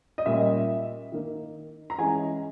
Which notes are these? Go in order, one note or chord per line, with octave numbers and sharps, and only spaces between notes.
D#5
A#2 G3 C#4 E5
D#3 A#3 D#4
A#5
E3 G#3 C#4 G#5